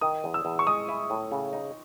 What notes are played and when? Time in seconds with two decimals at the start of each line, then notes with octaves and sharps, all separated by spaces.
0.01 D#3 D#6
0.24 E2
0.34 E6
0.45 E2
0.59 C#6
0.67 G#3 D#6
0.89 E4
1.10 A2
1.32 C#3
1.53 D#4